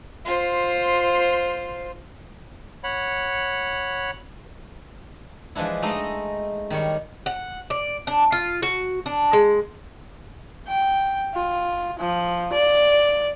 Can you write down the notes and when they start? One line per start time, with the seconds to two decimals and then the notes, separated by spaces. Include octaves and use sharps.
0.25 F4 C5
2.84 C#5 F#5 B5
5.55 E3 F3 G#3 D4 E4
5.82 G#3 A3 D#4 A4 D#5
6.70 D#3 G3 C#5
7.26 F#5
7.70 D5
8.07 D4
8.32 F4
8.62 F#4
9.06 D4
9.33 G#3
10.68 G5
11.34 F4
11.99 F3
12.53 D5